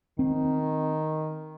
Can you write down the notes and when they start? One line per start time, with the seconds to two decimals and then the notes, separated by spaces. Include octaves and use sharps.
0.19 D#3 C4